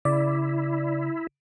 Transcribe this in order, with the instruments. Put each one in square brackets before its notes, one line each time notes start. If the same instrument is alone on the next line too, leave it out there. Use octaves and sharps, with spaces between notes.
[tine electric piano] C#3 [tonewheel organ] E4 [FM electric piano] D5